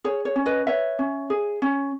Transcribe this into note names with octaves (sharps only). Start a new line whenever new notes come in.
G#4 C#5
C#5
C#4
B4 D#5
B4 C#5 E5
C#4
G#4
C#4